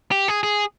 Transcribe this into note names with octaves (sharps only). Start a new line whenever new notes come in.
G4
G#4
G#4